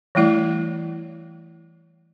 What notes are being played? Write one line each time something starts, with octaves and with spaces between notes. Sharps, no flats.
E3 G3 A3 E4 D5